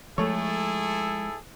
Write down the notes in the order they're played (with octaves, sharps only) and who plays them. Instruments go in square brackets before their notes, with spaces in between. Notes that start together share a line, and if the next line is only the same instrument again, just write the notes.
[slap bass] F3 G#3 [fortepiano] A3 C#5 [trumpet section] E4 G#4 A4